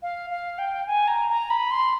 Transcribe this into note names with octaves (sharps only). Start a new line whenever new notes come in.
F5
F5
G5
G#5
A#5
A#5
B5
C6